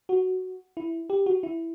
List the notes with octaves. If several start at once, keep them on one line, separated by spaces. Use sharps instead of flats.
F#4
E4
G4
F#4
E4